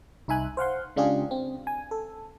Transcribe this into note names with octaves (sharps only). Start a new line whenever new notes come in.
C2 D#4 E5 G#5 F#6
C5 F5 F#5 C6
C#3 G#3 D4 F4 G4 G#4
C4
G#5
A4